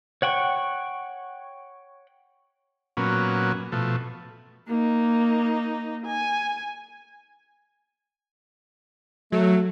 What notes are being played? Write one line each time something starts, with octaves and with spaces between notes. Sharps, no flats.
C#5 F#5 G5 C#6
A#2 F#3 B3 C#4
B2 F3 A3
A#3 D#4
G#5
F#3 A3